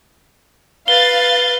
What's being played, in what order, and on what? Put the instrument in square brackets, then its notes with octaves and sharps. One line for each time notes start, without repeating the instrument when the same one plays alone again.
[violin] B4 [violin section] F5 A6 [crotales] G7